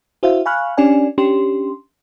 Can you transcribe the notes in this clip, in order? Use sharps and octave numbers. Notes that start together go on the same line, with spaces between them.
E4 F#4 C5 E5 F5
F5 G#5 B5 C#6 F6 F#6
C#4 D4 G4 D5 G#5
C#4 D4 G4 C6